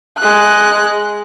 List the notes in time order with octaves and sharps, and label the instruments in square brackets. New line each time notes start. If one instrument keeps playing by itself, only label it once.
[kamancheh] G#3 F#6